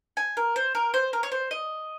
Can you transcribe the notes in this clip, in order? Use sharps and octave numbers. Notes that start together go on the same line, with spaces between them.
G#5
A#4
C5
A#4
C5
A#4
C#5
C5
D#5